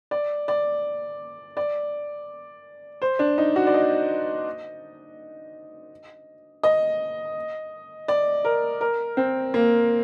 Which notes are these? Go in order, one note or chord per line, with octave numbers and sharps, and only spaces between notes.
D5
D5
D5
C5
D4
D#4
F#4
D5
D#5
D#5
D5
A#4
A#4
C4
A#3